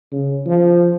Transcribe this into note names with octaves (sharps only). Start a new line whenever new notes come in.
C#3
F3